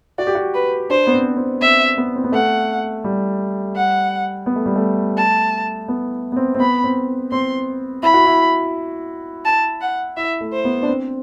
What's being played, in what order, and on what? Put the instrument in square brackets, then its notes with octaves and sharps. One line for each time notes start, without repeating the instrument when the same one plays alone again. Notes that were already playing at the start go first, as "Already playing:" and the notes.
[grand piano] F#4 [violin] D5
[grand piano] G4
F#4
[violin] B4
[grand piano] D4 [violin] C5
[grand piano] B3
C4
C4
[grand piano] C4 [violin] E5
[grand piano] B3
C4
B3
[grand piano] A3 [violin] F#5
[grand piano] G3
[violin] F#5
[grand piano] B3
A3
G3
A3
[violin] A5
[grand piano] B3
B3
C4
C4
[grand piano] B3 [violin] B5
[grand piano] C4
[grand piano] C4 [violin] C6
[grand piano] E4 [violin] B5
[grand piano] F#4
E4
[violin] A5
F#5
[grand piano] E4 [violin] E5
[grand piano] A3
[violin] C5
[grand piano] B3
D4
C4